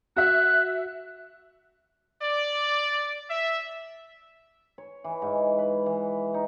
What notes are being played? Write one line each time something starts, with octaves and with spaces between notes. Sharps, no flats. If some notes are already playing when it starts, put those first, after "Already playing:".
F#4 E5 F#6
D5
E5
C#5
E3
G#2
B4
E3
D#4